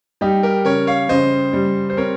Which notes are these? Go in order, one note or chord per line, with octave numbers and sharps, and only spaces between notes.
G3 D#4 G4
G4 A#4
C#3 A#4 C#5
C#5 F5
C#3 C5 D#5
G3
C5
C4 A#4 C#5